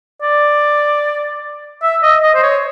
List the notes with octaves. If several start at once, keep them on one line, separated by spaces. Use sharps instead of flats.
D5
E5
D#5
D#5
C5
C#5